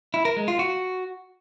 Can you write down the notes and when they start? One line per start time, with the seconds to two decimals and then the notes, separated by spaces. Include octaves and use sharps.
0.14 E4
0.25 A#4
0.37 G#3
0.48 F4
0.59 F#4